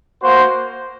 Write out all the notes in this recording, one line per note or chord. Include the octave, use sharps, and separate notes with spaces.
A#3 F#4 C5